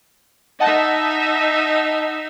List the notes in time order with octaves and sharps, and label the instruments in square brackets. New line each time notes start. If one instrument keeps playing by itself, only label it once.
[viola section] D#4 E5 [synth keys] D#5 F#5 A5